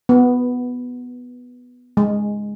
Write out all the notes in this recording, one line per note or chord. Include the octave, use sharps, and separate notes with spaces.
B3
G#3